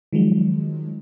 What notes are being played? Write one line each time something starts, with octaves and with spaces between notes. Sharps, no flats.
D#3 F3 F#3 G#3